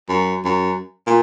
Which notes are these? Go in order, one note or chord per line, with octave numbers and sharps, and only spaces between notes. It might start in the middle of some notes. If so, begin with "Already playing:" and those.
F#2
F#2
A#2